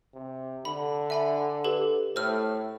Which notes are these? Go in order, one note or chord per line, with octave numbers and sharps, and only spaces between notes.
C3
D3 B5
E5 G#5 B5
G4 A4 B4
A2 C5 E6 F6